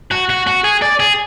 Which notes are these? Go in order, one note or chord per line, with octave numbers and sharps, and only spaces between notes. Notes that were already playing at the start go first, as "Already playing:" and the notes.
F#4
F#4
F#4
G#4
D5
G#4